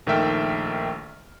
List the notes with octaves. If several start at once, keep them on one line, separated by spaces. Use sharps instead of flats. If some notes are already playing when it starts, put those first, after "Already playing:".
A#1 D#3 A3 E5 G5 F6